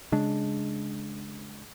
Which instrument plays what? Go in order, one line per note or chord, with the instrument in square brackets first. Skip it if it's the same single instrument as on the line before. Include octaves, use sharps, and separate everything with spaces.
[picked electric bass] C#3 G#3 D4